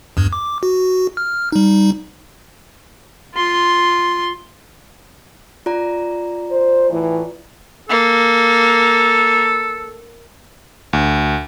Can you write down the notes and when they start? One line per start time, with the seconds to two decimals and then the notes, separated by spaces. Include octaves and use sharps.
0.17 E2 G2
0.33 D6
0.63 F#4
1.17 F6
1.52 G3 D#4
3.35 F4 C6
5.66 F4 D5 A#5
6.51 C5
6.90 A2 E3
7.89 A#3 A4
10.93 D2